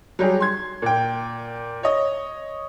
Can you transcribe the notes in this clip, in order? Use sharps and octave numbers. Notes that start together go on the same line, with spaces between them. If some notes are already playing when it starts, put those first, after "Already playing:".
F#3 G3 G4 G#4
C6 G#6
A#2 G5
C#5 D#5